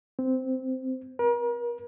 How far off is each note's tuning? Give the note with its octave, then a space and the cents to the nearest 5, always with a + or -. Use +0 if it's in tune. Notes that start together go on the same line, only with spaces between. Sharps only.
C4 -10
A#4 +40